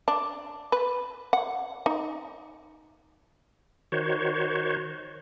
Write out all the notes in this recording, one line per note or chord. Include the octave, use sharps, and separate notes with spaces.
D4
B4
F#5
D#4
D#3 F#4 C5 C#5